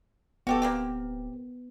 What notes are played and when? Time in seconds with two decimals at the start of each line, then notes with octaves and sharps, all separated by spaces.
0.47 D1 B3 F#4 G4 A4
0.62 A#3 C4 G4